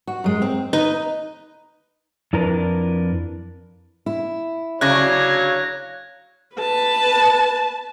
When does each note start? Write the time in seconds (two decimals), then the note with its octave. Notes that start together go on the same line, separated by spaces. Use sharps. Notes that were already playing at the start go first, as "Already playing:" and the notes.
0.07 F#4
0.24 F#2 G#3
0.42 C4
0.73 D#4 B4
2.33 F2 D4 E4 A#4 B4 A#5
4.06 E4
4.81 C#3 F#3 D4 C#5 F5 F#6 G#6 A#6
6.56 B4 A5